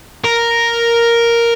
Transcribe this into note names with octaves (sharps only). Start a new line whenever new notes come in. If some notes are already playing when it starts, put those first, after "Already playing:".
A#4